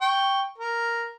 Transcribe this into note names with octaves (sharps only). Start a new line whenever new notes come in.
G5 C#6
A#4